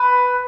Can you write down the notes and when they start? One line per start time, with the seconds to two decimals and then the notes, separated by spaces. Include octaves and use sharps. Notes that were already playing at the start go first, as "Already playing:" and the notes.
Already playing: B4